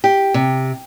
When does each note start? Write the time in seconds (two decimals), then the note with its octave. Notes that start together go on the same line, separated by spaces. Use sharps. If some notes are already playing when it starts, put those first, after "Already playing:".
0.04 G4
0.34 C3